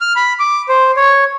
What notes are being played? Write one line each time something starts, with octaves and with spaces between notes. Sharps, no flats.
F6
B5
D6
C5
C#5